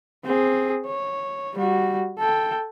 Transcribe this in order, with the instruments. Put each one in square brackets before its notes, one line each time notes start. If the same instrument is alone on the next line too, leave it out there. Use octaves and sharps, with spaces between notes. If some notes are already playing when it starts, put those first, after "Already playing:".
[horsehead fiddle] C4 G#4
C#5
G3 F#4
A4 G5